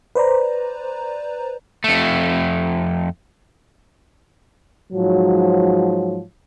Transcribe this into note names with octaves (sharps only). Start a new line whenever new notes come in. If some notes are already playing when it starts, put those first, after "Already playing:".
B4 C5 D5 A#5
F2 A3
G#2 F3 F#3